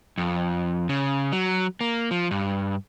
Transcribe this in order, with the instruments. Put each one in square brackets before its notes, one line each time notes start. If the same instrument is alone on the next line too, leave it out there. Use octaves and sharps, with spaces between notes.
[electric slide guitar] F2
C#3
F#3
A#3
F3
G2